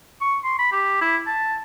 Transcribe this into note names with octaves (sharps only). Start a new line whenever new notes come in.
C#6
C6
B5
G4
E4
A5